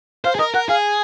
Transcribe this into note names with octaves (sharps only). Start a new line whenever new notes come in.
C5 F5
G#4
A#4 D#5
A#4 F#5
G#4 F5